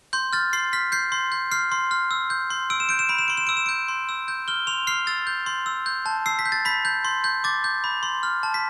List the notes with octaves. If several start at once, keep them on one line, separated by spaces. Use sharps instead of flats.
C6 G6
F6 A6
C6 C7
F6 B6
G6 C7
C6
G6
F6 C7
C6
F6
E6
G6
C6
E6 D7
E7
G6 D7
E7
B5 D7
E7
C6 D7
E7
E6 D7
E7
D7
G6
C6
E6
G6
F6 G7
C6 F7
F6 C7
E6 A6
G6
C6
E6
G6
A5
E6 C7
B6
G6
A6
B5 B6
G6
C6
G6
D6 A6
G6
B5
C6
F6
A5
B6